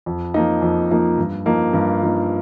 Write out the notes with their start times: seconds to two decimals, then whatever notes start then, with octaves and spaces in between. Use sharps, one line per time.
0.06 F2
0.34 F3 A#3 D#4
0.62 F2
0.90 F3 A#3 D#4
1.18 G2
1.46 F3 A#3 D#4
1.73 G2
2.02 F3 A#3 D#4